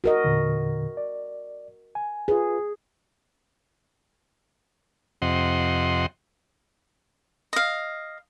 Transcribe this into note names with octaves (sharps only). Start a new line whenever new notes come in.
F#4 A#4 D#5
E2 A#2 D3
D5
G#5
F4 G#4 B4
F2 C3 D#5 F#5 C6
D#5 F5